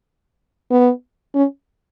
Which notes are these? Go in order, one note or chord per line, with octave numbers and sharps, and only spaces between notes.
B3
C#4